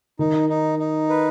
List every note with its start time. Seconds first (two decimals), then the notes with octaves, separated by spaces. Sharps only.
0.19 D#3 D#4
0.49 D#4
0.79 D#4
1.09 B4